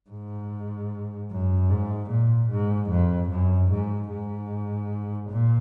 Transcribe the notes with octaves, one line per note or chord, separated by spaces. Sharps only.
G#2
F#2
G#2
A#2
G#2
F2
F#2
G#2
G#2
A#2